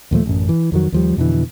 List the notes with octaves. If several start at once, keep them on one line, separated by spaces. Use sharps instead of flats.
D#2 A#2 F3 A3
A1 F#2
E3
F2 D#3 F#3
D#2 F3 G3
F2 B2 D3 E3